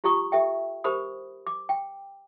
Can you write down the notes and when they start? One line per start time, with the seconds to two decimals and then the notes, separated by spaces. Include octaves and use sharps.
0.04 F4 G4 A#5 C#6 D#6
0.32 G4 A4 E5 G5
0.84 G4 A#4 C5 B5 D#6
1.47 D6
1.69 G5